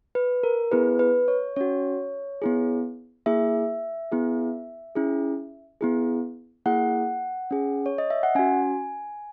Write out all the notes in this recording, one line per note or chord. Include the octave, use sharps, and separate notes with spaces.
B4
A#4
B3 E4 G#4 B4
B4
C#5
C#4 F#4 C#5
B3 E4 G#4
A#3 E4 G#4 E5
B3 E4 G#4
C#4 E4 G#4
B3 E4 G#4
A#3 E4 G#4 F#5
C#4 G#4
C#5
D#5
E5
F#5
C#4 F#4 G#5